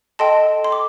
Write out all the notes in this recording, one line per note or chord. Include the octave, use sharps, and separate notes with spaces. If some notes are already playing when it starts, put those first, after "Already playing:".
A4 D#5 G5 A5 C6
C6
D6